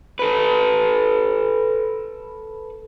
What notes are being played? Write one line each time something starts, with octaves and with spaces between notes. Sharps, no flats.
A4 B4